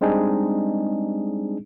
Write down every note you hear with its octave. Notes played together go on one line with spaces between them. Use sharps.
G3 G#3 C4 D4 D#4 G#4